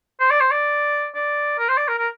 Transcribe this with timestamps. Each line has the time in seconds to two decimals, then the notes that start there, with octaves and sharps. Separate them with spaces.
0.20 C5
0.30 D5
0.40 C5
0.51 D5
1.15 D5
1.58 A#4
1.69 C5
1.77 D5
1.88 A#4
1.98 A#4